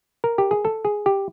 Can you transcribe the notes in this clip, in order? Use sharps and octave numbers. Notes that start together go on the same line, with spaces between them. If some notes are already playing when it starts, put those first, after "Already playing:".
A#4
G4
G#4
A4
G#4
G4